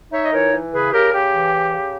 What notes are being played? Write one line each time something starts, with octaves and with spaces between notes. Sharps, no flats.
D#4 C#5 E5
D#5
E3 A#4 C#5
E3
C#3 G#4 B4
C#3 G4 A#4
C#3 G4
E3
C#3
C#3